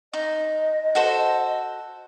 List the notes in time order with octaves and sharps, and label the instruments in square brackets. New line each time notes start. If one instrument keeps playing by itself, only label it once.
[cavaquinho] D#4 [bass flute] D#5
[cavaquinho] F#4 A4 C5